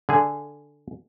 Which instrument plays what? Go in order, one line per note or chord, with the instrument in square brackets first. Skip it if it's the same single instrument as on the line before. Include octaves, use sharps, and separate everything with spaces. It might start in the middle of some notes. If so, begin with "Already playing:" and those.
[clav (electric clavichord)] D3 G#4